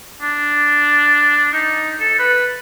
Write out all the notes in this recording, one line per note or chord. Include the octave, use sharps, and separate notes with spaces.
D4
D#4
A4
B4